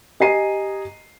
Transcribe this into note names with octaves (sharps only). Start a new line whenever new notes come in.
G4 D#5 G#5 A#5 C7 D#7